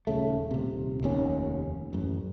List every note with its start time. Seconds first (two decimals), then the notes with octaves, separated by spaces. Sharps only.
0.07 D#1 C#3 A3
0.51 D#1 C3
1.03 F1 D#2 C#4
1.93 A1 F#2